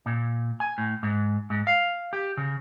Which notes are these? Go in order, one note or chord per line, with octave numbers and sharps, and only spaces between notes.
A#2
G#5
A2
G#2
G#2
F5
G4
C#3